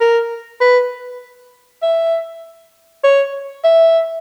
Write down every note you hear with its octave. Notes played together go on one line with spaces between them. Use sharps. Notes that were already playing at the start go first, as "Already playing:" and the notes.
A#4
B4
E5
C#5
E5